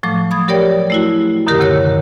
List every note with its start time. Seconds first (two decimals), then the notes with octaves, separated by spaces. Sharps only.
0.03 A2 F3 F#3 A3 D6
0.31 B5 D#6 G#6
0.48 F#3 G4 A#4 C#5 D5 G5
0.90 A3 E4 F#4
1.47 F#2 B2 D3 D#3 G4 A#4
1.59 D2 C3 A#4 C#5 F#6